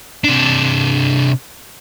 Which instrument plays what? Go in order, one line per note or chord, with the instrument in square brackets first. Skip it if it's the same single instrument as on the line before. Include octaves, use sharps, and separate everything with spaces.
[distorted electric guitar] C3 D4